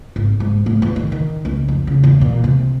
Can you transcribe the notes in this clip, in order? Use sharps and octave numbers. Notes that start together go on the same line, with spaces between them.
G#1
G#2
A2
E2
D#3
D#3
C#2
F2
C#3
E2
A#2
C3